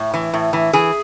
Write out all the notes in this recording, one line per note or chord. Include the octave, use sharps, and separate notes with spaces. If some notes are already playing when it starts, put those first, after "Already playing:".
Already playing: A2
E3
A2
E3
E3 G#4